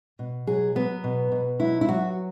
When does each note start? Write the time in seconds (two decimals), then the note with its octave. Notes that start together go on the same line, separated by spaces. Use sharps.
0.19 B2
0.47 F#3 G#4
0.75 F#3 B3
1.04 B2
1.32 B2
1.60 F#3 E4
1.81 E4
1.88 F#3 F#4